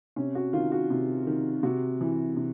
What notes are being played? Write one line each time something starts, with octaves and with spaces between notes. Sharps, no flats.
C3 C#4
F#4
D#3 F4
F#4
C3
D#3
C3 F#4
E3
C3